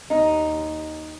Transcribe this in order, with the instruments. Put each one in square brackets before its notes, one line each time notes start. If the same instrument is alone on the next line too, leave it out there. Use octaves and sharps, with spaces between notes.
[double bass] D#2 [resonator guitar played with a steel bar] D#4